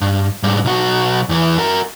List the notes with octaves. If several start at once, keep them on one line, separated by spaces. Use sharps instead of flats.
G2
G#2 G3
B1 F#4
E2 E3
F#4 A#4